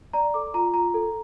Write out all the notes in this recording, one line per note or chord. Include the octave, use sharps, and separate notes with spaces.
D5 A#5
A4 D6
F4 A#5
F4 A#5
A4